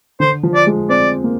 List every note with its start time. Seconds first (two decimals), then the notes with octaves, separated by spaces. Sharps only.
0.20 D3 C5
0.43 F3
0.55 D5
0.66 G#3
0.89 C4 D5
1.24 A#3